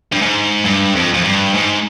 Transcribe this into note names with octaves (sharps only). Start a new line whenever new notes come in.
G2
G#2
G2
F2
F2
G2
G#2